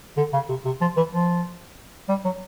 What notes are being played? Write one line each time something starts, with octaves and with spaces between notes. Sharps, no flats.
D3
C#3
C3
C3
F3
E3
F3
G3
F#3